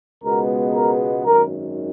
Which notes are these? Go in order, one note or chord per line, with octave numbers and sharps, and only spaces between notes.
C#2 B2 G#3 B3 A#4
A#4
G#1 F#2 D#3 A#4